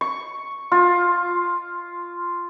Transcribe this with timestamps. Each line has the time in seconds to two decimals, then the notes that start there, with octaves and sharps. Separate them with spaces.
0.01 C#6
0.72 F4